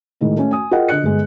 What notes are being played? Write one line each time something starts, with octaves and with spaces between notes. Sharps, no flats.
A2 D#3 G#3
A3 C#4
G#5 D#6
F4 G#4 A#4 D#5 F#5 G5
D3 D#5 F#6 C#7
G1 G#3